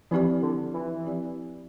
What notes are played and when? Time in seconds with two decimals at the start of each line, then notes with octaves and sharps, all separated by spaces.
0.11 E3 F3 C4 E4 G4 D5
0.42 D3
0.74 E3
1.05 F3 C4 E4 G4 D5